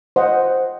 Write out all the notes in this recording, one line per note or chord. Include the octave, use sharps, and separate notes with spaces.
C5 D#5 F#5